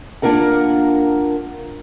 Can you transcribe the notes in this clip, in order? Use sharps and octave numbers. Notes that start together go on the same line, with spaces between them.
A#3 D4 F4 A#4 F#5